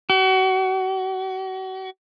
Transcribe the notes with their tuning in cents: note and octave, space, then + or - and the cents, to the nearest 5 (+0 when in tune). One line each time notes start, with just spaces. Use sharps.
F#4 +35